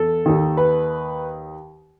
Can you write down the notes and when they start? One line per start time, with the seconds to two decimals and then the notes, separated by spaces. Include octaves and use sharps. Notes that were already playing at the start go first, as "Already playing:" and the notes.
Already playing: E2 A4
0.26 D#2 D#3
0.57 B4